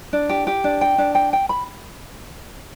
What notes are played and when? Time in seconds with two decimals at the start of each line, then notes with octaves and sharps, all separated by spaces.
0.13 D4
0.29 G4
0.47 G4
0.64 D4
0.81 G5
0.98 D4
1.15 G5
1.33 G5
1.49 B5